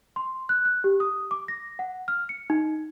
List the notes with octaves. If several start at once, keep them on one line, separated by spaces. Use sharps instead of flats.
C6
F#6
F#6
G4
D#6
D6
A#6
F#5
F6
C#7
D#4